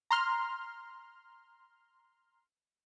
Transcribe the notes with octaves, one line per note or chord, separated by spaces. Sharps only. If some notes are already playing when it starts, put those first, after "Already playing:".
A#5 C6 F6